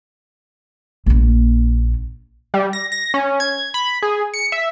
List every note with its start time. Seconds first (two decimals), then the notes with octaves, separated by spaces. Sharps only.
1.06 A#1 A#3
2.54 G3
2.73 A#6
2.92 A#6
3.14 C#4
3.40 G#6
3.74 B5
4.02 G#4
4.34 C#7
4.52 E5